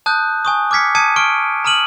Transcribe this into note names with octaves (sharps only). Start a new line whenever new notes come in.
A5 D#6 F#6 G6
G#5 C#6 D#6
D6 F6 G#6 B6 C#7
A5 D#6 G#6 C#7 D#7
C#6 F6 D7
A#5 D#6 F6 D#7 F#7